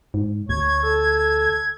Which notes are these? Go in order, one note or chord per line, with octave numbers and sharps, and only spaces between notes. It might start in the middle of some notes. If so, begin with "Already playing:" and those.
G#2
D2 C#5 G#6
A4